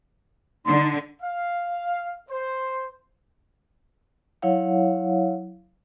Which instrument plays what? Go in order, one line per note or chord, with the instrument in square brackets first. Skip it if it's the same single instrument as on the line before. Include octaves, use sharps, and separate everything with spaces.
[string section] D3 [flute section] D#4 C6
[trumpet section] F5
C5
[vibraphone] F#3 E4 C#5 F5 F#5